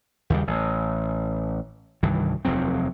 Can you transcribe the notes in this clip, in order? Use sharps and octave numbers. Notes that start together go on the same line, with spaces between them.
D#2 C#3 G3
A1
C2 G2 D#3 E3
F1 D#2 F#3 C4